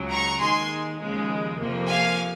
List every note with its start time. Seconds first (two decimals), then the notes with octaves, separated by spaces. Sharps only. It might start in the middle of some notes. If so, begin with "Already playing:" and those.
Already playing: C#2 C#3 F#3
0.10 A#5 C#6
0.40 D#2 D#3 G#3 G#5 C6
1.00 D#2 C#3 F3 G#3
1.59 F2 C3 F3 A#3
1.89 F5 G#5